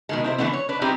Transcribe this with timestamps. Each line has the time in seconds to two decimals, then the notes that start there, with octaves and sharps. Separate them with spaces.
0.09 B2 D#3 G#3
0.24 C3 E4 C5
0.38 D3 E3 A3 B3 C4
0.53 C#5
0.69 D4 B4
0.81 G3 C4 D#4 E4 G4 G#4